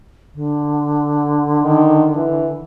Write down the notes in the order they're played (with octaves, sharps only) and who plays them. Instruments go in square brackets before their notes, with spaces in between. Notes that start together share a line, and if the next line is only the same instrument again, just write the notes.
[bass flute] D3
[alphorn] D#3
E3